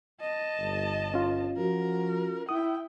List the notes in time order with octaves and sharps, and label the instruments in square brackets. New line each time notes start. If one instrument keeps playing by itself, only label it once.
[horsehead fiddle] D#5 A5
[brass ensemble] G1
[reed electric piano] C#4 F4
[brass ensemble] F3 F#4 [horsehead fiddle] A#4
[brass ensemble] E4 [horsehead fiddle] G5 [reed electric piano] D#6